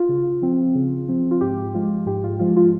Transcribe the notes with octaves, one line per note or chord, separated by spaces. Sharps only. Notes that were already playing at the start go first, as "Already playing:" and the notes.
Already playing: F4
C#3
F3 C4
C#3
F3 C4
F4
G#2 G4
F3 G#3 F4
G#2 G4
F4
F3 G#3 F4
F4